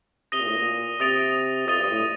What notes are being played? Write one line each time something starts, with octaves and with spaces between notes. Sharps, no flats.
C3 D#6 A#6 D#7 G7
A#2
A2
A#2
C3 D#6 A6 D7 F7
F2 D#6 A6 D#7 G7
G2
A2